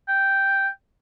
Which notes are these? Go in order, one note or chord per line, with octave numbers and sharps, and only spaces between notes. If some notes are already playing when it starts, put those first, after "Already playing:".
G5